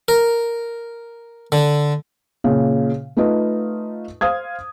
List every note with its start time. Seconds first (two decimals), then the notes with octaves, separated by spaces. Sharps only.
0.08 A#4
1.52 D3
2.44 A#2 C#3
3.17 A3 D#4 F4 B4 D#5
4.21 C5 F5 D#6 G#6